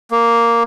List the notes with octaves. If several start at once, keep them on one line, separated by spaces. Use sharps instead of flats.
A#3